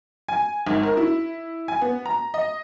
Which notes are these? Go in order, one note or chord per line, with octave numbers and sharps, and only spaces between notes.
G#5
G#1
A#4
E4
G#5
B3
A#5
D#5